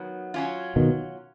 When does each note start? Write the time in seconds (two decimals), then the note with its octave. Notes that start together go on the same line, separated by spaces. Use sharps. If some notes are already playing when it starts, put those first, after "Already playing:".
Already playing: D#3 F#3 B3
0.34 F#3 C#4 F4
0.76 B2 D#3